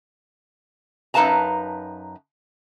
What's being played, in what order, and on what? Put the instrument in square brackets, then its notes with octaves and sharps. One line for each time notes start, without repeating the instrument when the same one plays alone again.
[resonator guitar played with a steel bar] F#2 D#4 B4 F5 A5 A#5